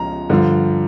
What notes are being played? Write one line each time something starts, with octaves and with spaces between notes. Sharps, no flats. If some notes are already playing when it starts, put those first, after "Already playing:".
Already playing: C#2 C#3 F3 A#5
G2 D3 F3